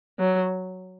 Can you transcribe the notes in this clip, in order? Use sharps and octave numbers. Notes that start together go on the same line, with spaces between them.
F#3